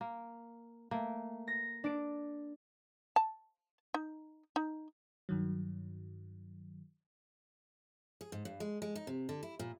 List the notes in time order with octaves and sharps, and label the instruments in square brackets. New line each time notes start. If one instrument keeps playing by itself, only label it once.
[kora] A#3
[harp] A3 [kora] A#3
[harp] A#6
D4 D7
[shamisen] A5
D#4
D#4
[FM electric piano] G2 D#3 F#3
[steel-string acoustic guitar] G#4
G#2
G2
G#3
G#3
D#4
C3
D3
E4
A#2